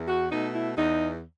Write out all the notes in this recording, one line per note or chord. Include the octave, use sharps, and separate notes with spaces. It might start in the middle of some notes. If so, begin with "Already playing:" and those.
Already playing: E2
F#4
B2 A3 D#4
E4
E2 D#4